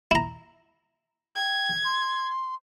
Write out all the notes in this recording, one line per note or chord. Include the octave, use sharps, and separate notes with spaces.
E4 A#5
G5 G#6
C6